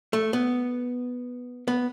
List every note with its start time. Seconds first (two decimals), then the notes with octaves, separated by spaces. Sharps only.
0.13 A3
0.33 B3
1.68 B3